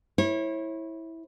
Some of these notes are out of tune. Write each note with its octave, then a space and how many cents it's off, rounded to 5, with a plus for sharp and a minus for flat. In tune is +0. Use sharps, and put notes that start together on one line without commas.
E4 -10 C#5 -35